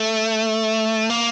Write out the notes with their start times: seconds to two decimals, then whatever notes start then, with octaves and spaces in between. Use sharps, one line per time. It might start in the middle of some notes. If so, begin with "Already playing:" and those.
Already playing: A3
1.10 A#3